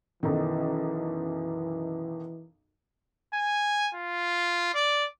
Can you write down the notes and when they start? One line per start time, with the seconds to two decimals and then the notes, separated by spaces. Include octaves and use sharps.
0.23 B1 F#2 D#3 E3
3.34 G#5
3.95 F4
4.74 D5